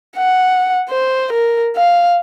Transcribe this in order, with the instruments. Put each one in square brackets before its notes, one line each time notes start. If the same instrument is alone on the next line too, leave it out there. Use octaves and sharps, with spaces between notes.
[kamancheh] F#5
C5
A#4
F5